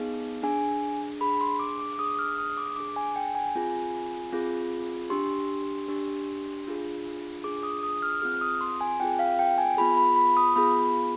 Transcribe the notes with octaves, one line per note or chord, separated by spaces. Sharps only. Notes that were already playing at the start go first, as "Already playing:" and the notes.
Already playing: B3 D#4 G#4
D4 G#4 G#5
D4 G#4 B5
C6
D6
D6
D6
D4 G#4 D#6
F6
D#6
D6
D4 G#4 D6
G#5
G5
G#5
C4 F4 G#4
C4 F4 G#4
D4 G4 C6
D4 G4
D4 F4 G#4
D4 F4 G#4 D6
D#6
D#6
F6
C4 F4 G#4 F6
D#6
C6
G#5
C4 F4 G#4 G5
F5
G5
G#5
B3 F4 G#4 B5
B5
B5
D#6
B3 F4 G#4 B5